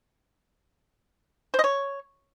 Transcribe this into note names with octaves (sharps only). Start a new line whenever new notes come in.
C5
D#5
C#5